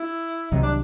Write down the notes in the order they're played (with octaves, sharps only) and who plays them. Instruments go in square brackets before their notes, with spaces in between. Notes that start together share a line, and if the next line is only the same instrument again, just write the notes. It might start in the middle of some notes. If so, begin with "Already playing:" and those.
Already playing: [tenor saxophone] E4
[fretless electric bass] C2 C3 D#3 F#3 [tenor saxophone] D#4
[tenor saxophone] D4